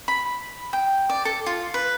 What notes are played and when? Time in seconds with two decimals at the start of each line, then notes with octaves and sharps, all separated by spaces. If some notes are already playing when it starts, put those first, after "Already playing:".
0.08 B5
0.73 G5
1.10 D5
1.25 A4
1.46 F4
1.74 B4